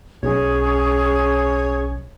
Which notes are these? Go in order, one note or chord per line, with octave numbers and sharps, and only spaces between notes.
B1 C#4 G#4 C#5